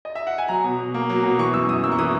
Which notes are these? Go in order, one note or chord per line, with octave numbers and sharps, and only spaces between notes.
D#5
E5
F#5
G#5
F#3 A#5
B2
B2
A#3
F#3
B2
E3 C#6
F#2 E6
F#2 D#6
A#3 E6
C#6
E3 D#6